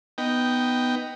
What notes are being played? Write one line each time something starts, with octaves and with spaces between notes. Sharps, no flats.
B3 D#4 G5